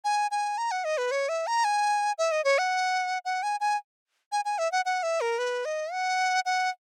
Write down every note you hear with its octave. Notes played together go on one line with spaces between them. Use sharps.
G#5
G#5
A#5
F#5
D#5
B4
C#5
E5
A#5
G#5
E5
D#5
C#5
F#5
F#5
G#5
G#5
G#5
G#5
E5
F#5
F#5
E5
A#4
B4
D#5
F#5
F#5